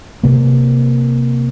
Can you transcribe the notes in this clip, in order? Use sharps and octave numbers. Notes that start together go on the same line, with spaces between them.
C3 A#3